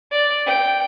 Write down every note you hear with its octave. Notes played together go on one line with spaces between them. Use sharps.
D5
G5